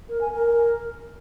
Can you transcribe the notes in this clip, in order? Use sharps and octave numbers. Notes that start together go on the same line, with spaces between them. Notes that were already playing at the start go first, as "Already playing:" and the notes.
A#4
G#5
A#4